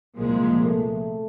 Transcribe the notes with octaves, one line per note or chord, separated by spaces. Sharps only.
C2 A#2 F3 G#3 A#3
A3